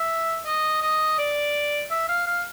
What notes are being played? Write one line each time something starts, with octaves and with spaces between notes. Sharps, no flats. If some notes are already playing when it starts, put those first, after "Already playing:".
Already playing: E5
D#5
D#5
D5
E5
F5
F5